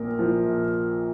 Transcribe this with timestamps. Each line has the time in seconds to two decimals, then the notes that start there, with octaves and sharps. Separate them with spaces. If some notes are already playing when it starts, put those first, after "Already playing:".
Already playing: A#1 A#2 A#4
0.19 F3
0.45 A#1